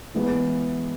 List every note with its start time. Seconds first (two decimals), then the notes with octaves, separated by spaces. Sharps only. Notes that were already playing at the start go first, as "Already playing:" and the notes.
0.14 E3 G#3 B3 E4